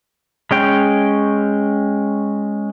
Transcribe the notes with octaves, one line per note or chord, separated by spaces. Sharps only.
G#3 C#4 G5